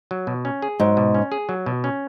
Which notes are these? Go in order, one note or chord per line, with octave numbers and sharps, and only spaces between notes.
F#3
B2
C#4
G#4
G#2 F#3
B2
C#4
G#4
F#3
B2
C#4